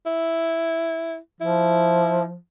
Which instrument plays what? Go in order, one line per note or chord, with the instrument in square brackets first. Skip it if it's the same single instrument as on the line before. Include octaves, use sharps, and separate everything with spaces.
[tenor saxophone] E4
[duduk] F3 [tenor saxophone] E4